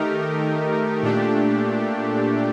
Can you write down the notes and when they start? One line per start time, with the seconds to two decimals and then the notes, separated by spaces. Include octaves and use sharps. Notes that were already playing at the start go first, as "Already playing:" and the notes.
Already playing: D#3 A3 D#4 G4 A#4
1.02 A#2 A3 D4 G4